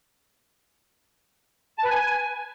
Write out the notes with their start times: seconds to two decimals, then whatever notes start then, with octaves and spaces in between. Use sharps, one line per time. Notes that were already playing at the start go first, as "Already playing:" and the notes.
1.78 A5
1.84 B4
1.89 G#5